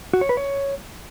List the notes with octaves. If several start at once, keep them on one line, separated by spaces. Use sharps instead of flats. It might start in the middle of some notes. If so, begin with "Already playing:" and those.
F#4
C#5
B4
C#5